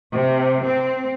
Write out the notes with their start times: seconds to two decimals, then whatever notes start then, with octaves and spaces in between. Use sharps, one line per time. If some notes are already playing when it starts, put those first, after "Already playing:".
0.12 C3
0.65 C4